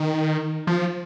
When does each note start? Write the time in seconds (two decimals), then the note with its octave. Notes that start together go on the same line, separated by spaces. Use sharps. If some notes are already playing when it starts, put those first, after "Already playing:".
Already playing: D#3
0.67 F3